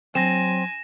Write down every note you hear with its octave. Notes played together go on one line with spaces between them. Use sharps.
F#3 C4 G#5 A#6 E7